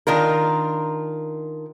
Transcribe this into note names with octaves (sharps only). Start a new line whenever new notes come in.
D#3 D4 F4 A#4